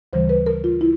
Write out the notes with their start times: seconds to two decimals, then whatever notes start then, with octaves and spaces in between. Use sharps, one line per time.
0.13 D2 C#3 E3 G3 C5
0.29 B4
0.46 A#4
0.64 F4
0.81 E4